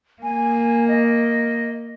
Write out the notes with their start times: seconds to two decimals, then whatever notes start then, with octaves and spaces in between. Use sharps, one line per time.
0.23 A#3 G#5
0.88 D#5